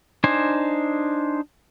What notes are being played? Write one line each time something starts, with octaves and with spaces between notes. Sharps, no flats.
D4 D#4 C5 G#5